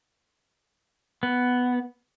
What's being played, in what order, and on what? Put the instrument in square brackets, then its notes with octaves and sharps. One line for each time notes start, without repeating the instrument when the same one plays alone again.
[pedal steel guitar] B3